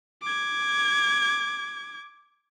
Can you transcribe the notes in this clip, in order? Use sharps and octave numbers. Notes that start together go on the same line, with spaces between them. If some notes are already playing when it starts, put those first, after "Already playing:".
D6 G#6